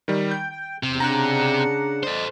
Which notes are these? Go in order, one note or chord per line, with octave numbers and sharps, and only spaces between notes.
D#3 G3
G5 G6
G5
E2 C3
C#3 D4 F#5 A#5 F#6
A4 C5 D5 D#5